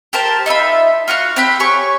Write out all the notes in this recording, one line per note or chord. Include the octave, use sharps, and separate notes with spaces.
G4 A#4 C5 A5
D#4 F4 E5 B5
F4 F#4 F#5 F6
C4 G4 B5 F#6
G4 C#5 G#5 C#6